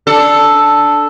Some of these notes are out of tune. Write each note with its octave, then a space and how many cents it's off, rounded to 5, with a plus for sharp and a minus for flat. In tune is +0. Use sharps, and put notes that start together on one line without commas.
D4 +0 A4 +0